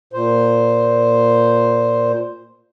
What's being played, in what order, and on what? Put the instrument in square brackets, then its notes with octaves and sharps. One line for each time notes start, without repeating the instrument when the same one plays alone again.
[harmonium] A#2 C5